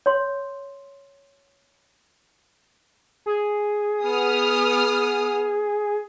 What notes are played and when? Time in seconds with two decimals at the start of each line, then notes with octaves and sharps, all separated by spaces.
0.06 C#5 C6
3.26 G#4
4.03 B3 D#6 F6